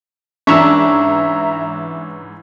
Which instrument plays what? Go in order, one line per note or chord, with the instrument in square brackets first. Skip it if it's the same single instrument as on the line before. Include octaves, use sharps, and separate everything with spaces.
[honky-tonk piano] G#2 E3 C#4 [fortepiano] D4 [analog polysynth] E5 A#5 [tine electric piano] C#6 E6